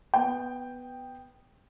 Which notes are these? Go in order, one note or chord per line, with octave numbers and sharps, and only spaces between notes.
B3 G5